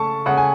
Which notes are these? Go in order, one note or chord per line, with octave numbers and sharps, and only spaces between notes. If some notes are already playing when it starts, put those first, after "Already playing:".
Already playing: C#3 A3 A5 C#6
C#3 F#5
G#5